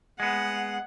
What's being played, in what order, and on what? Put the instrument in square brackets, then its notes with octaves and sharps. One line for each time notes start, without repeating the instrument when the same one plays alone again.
[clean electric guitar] G#3 B3 [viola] F#5